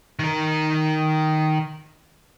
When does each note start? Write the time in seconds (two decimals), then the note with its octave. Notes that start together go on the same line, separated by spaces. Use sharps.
0.19 D#3 A#4